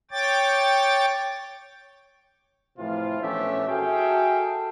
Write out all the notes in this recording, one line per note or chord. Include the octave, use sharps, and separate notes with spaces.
C#5 G5 D6 A6
A2 C3 E3 F3 F4
A#1 E2 A3 C#4 G4 E5
F#4 G#4 A4 E5 F5 G5